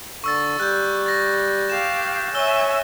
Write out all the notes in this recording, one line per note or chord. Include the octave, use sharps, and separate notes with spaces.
D3 C#6 E6 A6
G3 F#6 G6
A6 A#6
G4 F5 E7
C#5 E5 G#5 E6 G7